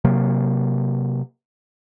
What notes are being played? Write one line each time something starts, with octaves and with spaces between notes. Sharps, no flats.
C3 F#3 A#3